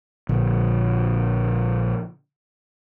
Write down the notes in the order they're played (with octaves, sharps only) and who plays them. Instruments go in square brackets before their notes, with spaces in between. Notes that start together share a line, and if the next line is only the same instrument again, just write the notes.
[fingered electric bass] A#1 D3